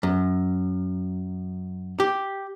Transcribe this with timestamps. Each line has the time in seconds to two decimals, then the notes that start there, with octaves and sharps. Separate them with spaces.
0.03 F#2
2.00 G4